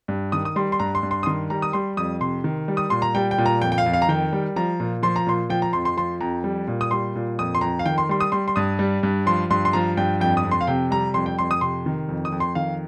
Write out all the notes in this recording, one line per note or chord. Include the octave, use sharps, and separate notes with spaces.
G2
D#3 D#6
D#6
G3 C6
C6
G2 A#5
C6
G2
C6
D#6
D#3 C6
G3 A#5
D#6
G3 C6
F2 D#6
C3 C6
D#3
G3
D#6
A#2 C6
A#5
G3 G5
G5
A#2
A#5
F2 G5
G5
F5
F2
F5
A#5
D#3 G5
G3
F3 A#5
A#2
F3 C6
A#5
A#2 C6
F3 G5
A#5
F2 C6
C6
F3 C6
F2 A#5
G3
A#2
D#6
G3 C6
A#2
F2 D#6
C6
F2 A#5
F5
D#3 G5
C6
G3 C6
D#6
G3 C6
C6
G2 D#6
G3
G2
F3 C6
G2 C6
C6
F3 A#5
G2 G5
F2 G5
D#6
F2
C6
F5
C3 G5
G3 A#5
F2 C6
G5
F2 C6
D#6
C3 C6
D#3
F2
D#6
F2
C6
D#3 F5